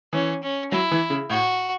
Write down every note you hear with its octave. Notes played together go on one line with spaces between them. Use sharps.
E3 C#4
C#4
F#3 E4
E3
C#3
A2 F#4